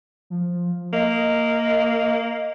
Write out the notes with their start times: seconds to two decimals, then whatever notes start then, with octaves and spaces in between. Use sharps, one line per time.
0.30 F3
0.93 A#3 D#5